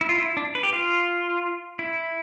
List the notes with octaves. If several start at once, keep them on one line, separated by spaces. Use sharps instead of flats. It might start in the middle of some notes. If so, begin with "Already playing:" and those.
E4
F4
E4
D4
B4
G4
F4
E4